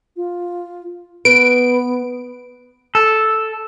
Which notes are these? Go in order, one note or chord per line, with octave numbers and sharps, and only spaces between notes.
F4
B3 B4 D7
A4